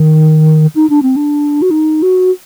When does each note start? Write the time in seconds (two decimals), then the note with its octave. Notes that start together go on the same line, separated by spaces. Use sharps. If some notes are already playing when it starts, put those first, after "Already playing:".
Already playing: D#3
0.75 D#4
0.90 D4
1.02 C4
1.16 D4
1.62 F#4
1.71 D#4
2.02 F#4